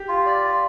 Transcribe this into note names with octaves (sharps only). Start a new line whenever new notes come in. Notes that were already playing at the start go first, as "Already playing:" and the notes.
Already playing: G4
F4
D5
F4